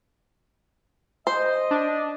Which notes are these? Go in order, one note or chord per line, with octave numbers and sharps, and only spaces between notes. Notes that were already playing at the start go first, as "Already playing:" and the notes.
C5 D#5
D4